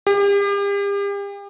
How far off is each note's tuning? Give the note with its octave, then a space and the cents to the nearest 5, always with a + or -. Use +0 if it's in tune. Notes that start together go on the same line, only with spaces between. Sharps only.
G4 +40